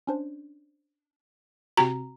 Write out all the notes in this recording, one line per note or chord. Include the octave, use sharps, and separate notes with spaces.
C#4 D4 C5
C3 C4 F#4 A#5